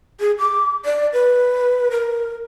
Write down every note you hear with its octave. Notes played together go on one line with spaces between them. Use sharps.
G#4
D6
D5
B4
A#4